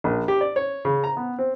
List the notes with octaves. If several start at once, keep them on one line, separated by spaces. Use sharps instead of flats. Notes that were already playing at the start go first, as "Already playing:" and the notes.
A#1
G4
D5
C#5
C#3
A#5
B3
C4